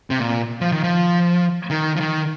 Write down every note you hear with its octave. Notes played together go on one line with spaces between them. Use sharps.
C3
A#2
F3
D#3
F3
D#3
F3
D#3